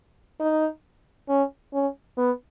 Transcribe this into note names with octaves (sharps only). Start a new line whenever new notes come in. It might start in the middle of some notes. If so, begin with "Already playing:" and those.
D#4
C#4
C#4
B3